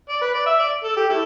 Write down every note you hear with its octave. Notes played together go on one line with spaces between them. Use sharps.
D5
B4
D5
E5
D5
A4
G4
E4 A4